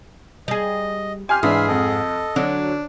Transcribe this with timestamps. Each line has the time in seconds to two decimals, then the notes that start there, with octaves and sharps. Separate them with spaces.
0.48 G3 G#4 D#5
1.29 G4 G#5 C6 F6
1.43 G#2 E3 D4 G#4 E5 B5 C6
1.68 F2 A4 D#5
2.36 D3 F#3 D4